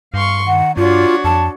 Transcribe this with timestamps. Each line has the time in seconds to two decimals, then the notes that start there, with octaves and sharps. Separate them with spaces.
0.14 G2 F5 C6 C#6
0.47 D#3 F#5
0.77 G2 D4 F4 F#4 C#5
1.24 F2 A5